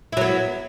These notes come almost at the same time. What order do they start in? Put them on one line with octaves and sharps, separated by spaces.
E4 F#3 B3